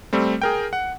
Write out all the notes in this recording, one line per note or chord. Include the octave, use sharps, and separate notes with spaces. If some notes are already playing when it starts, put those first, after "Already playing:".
G3 A3 C4
G#4 A#4 G5
F#5